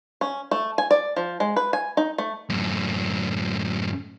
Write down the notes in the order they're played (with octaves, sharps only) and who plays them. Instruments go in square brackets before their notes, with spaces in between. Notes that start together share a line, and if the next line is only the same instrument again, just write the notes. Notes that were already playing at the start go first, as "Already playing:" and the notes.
[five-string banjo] C#4
A3
G#5
D5
F3
G#3
B4
G#5
D#4
A3
[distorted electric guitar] F#2 A2